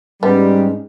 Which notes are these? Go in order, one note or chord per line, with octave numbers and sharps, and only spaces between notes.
G#2 G3 B3 C#4